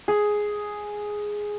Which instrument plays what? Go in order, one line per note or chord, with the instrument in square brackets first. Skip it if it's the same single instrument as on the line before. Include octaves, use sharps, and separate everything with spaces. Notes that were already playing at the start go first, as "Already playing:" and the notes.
[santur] G#4